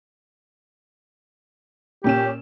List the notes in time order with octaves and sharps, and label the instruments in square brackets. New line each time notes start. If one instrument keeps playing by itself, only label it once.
[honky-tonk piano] A#2 C#4 E7 [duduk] G4